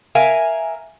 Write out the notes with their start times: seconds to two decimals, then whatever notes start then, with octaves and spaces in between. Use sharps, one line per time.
0.15 A#4 E5 F5 G#5